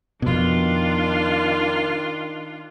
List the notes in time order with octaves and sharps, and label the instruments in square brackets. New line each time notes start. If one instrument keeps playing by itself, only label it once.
[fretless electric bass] F2 B2 [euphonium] D#3 [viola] D4 F4